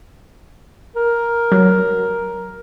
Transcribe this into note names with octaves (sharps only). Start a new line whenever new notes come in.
A#4
F#3